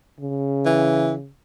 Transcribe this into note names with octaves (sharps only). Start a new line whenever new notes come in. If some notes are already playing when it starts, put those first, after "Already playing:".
C#3
E3